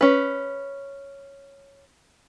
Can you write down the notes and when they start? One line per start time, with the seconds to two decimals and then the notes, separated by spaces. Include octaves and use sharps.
0.01 C#4 B4